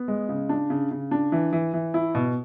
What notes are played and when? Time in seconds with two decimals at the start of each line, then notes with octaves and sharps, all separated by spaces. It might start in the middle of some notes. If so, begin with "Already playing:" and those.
Already playing: B3
0.08 G#3
0.29 C#3
0.49 D4
0.70 C#3
0.91 C#3
1.11 D4
1.32 E3
1.53 E3
1.74 E3
1.94 E4
2.15 B2